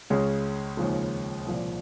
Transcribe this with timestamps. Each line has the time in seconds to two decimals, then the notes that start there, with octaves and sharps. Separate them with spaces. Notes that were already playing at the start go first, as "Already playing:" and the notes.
0.10 C#2 C#3 G#3 C#4
0.77 D#2 C#3 F3 G#3
1.45 C2 A#2 F3